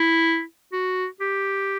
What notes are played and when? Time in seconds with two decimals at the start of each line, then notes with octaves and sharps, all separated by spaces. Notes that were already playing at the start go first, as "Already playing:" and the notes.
Already playing: E4
0.73 F#4
1.21 G4